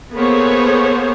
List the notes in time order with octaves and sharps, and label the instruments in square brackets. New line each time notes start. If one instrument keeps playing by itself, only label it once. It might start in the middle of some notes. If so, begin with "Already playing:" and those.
[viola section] A#3 B3 G#4 A4 C5 C#5